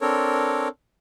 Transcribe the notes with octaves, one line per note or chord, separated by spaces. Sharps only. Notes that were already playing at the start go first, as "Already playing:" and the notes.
C4 D4 A4 A#4 C#5